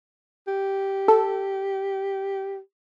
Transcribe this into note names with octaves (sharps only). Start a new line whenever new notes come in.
G4
A4